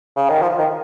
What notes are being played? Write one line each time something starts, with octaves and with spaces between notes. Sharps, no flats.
C#3
D#3
F3
D#3